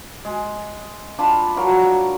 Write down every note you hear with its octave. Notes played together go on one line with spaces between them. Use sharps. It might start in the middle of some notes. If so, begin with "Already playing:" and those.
G#3
D4 F4 A5 B5
F#3 A#4 F5